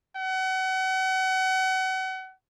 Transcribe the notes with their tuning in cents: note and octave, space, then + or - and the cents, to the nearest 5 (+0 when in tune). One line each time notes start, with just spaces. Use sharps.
F#5 +35